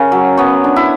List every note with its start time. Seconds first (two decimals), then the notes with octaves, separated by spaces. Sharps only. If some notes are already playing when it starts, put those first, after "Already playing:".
Already playing: C#3 C#4 A#4
0.12 F#3
0.37 B3 C#5
0.64 D4
0.76 E4